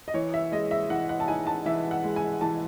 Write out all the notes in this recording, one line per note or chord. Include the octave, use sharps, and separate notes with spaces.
D#5
E3 C#5
E5
G#3 D#5
E5
E3 F#5
F#5
A5
D#4 G#5
A5
E3 E5
F#5
G#3
G#5
E3 A5